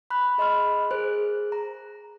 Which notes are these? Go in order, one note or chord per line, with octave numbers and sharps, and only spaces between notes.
B5 F#6
G#4 D#5 B5 C6 F6
G#4 A#4 C5 F#6
A#5